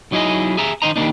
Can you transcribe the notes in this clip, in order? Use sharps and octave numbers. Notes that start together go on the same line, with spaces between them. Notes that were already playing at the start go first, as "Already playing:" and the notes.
F#3 D#4 E4 G#4 D#5
G#4 E5 A#5
D#3 D#4 C5 D#5 A#5
D#3 G3 G#3 A#3 D4 D#4